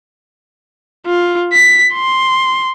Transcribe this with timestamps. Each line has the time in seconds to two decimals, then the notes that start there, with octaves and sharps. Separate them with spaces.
1.06 F4
1.53 B6
1.94 C6